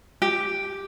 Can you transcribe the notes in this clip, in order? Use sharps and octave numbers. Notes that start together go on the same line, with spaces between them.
G4